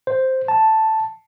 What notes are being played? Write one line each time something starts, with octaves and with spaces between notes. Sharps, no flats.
C5
A5